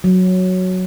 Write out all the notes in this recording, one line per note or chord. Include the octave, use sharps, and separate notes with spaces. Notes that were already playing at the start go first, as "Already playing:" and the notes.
F#3